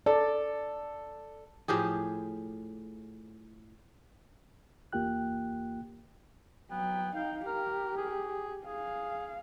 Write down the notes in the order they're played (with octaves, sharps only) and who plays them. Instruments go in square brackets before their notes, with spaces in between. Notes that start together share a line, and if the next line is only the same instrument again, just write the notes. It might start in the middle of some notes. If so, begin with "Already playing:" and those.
[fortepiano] A4 [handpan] D5
[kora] A2 F3 G4 G#4
[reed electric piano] E2 A#3 F4 G4 G5 F#6
[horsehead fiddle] F#3 G5 [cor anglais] B3
[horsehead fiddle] D#4 F5 [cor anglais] G5
[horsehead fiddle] G4 [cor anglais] A#4
[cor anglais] G#4
[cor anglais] G#4 [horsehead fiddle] F5